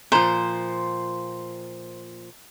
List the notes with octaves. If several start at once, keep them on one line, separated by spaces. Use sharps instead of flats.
A#2 F3 C5